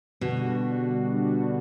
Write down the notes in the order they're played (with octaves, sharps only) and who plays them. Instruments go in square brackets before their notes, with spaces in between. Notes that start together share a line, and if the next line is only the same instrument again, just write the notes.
[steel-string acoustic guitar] B2 [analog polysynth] D3 G3 D4 F#4
[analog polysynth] D3 G3 D4 F#4